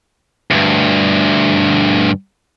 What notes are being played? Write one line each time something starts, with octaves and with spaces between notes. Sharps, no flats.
D2 G2